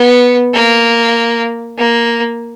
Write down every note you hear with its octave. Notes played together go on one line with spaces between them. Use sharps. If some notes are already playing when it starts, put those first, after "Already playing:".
Already playing: B3
A#3
A#3